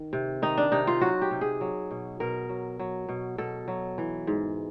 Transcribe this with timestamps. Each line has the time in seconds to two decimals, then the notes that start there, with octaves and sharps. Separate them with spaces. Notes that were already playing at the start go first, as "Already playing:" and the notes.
Already playing: D#3
0.13 C3
0.42 D#3 D#4
0.57 D4
0.72 C3 D#4
0.87 F4
1.01 F#3 F#4
1.22 G4
1.31 C3
1.41 G#4
1.61 F#3
1.91 B2
2.20 B2 A#4
2.49 F#3
2.79 F#3
3.09 B2
3.38 B2 A4
3.68 F#3
3.98 E3
4.27 G#2